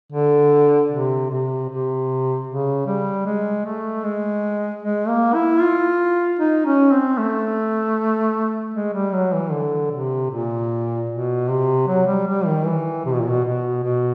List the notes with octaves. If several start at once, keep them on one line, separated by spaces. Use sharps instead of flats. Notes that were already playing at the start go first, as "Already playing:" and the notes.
D3
C3
C3
C3
C#3
G3
G#3
A3
G#3
G#3
A#3
E4
F4
D#4
C#4
C4
A3
G#3
G3
F#3
E3
D3
C3
A#2
B2
C3
F#3
G3
G3
D#3
E3
C3
B2
A#2
B2
B2
B2